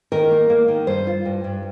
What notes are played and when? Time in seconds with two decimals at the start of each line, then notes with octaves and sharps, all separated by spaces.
0.12 D#3 A#4
0.31 A#3
0.50 A#3
0.68 D#3
0.87 G2 C5
1.07 F4
1.25 G2
1.44 G2